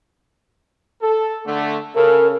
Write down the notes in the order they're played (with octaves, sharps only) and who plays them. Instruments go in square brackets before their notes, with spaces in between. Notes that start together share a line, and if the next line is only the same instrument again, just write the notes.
[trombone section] A4
D3 A3
[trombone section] C#3 A4 [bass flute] A#4